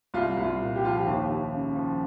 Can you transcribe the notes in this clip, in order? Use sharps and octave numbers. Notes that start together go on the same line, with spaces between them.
C2 F4
C2
F4
A#2
G4
F3 F4
G4
D#2
D#2
C#3
F3